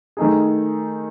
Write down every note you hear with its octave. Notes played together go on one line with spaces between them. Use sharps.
D#3 A3 D#4 G#4